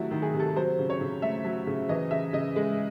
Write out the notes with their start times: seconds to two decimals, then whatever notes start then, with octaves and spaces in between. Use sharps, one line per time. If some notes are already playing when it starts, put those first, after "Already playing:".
Already playing: C3 D#3 F#3 A3 E4 F#4
0.11 D#3
0.22 G#4
0.34 C3
0.40 A4
0.56 F#3 C5
0.79 C#3
0.90 C#5
1.01 C#3
1.22 A3 E5
1.45 F#3
1.67 C#3
1.89 E3 D#5
2.11 C#3 E5
2.33 C#3 D#5
2.56 G#3